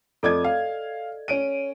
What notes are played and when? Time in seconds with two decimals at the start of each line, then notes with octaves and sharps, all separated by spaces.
0.23 F2 A4 D5 D#5 D6 G#6
0.44 F5
1.28 C#4 D7 D#7